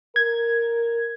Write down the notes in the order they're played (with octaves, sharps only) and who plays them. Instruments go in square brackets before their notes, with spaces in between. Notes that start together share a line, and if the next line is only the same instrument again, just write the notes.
[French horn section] A#4 [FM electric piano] G#6